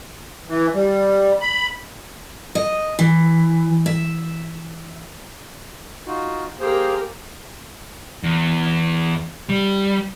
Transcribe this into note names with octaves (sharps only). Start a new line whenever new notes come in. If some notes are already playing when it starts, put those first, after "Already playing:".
E3
G3
B5
D#5
E3
E5
D#4 F4 F#4
A#3 G4 G#4 A#4 C5
E2
G3